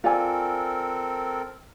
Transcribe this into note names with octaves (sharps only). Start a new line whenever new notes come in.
C4 F4 A4 A#4 D5 G#5